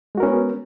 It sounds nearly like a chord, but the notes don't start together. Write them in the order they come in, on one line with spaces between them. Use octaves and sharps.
G#3 F#4 A#4 C#4 B3